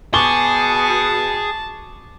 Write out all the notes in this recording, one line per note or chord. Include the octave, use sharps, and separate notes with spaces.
B2 G#4 A5 C#6 D6 G7